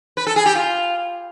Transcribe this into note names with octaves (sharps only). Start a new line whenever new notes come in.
B4
A4
G#4
G4
F4